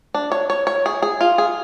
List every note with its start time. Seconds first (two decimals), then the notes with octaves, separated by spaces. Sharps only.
0.14 D4
0.32 C#5
0.50 C#5
0.67 C#5
0.86 G#4
1.02 G#4
1.21 F4
1.38 G#4